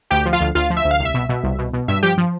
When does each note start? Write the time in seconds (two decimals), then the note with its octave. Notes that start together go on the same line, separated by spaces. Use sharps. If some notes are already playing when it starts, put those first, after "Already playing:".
0.10 D2 G4 G5
0.25 F3
0.33 F4 F5
0.40 D2
0.55 D2 F4 F5
0.70 F3
0.77 E5
0.85 D2
0.91 F5
0.99 C2
1.05 E5
1.14 B2
1.29 B2
1.43 C2
1.58 B2
1.73 B2
1.88 G2 E5
2.03 F3 G4 G5
2.18 F3